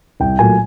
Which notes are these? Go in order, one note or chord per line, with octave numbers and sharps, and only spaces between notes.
C2 G5
A#2 F#3 A3 G#5